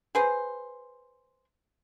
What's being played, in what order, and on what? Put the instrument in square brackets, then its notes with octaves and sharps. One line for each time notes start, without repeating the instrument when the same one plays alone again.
[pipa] G#4 B4 C5